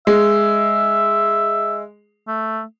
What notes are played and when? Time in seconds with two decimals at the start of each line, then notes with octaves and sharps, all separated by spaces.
0.07 G#3 E5
2.27 A3